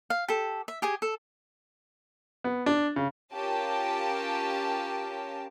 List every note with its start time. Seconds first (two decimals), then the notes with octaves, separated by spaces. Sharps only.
0.10 F5
0.28 G4 A4
0.68 E5
0.82 G4 G#4 G#5
1.02 A4
2.44 B3
2.66 D4
2.96 C#3
3.34 C#4 F4 G4 A#4 G5 A5